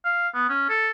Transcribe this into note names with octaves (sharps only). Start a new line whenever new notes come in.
F5
B3
C#4
A4